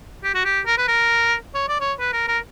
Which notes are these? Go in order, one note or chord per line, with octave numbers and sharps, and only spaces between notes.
G4
F#4
G4
A#4
B4
A#4
C#5
D5
C#5
B4
A#4
A#4